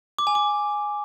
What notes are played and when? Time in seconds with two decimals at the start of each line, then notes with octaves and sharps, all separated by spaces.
0.19 D6
0.27 G#5
0.35 D6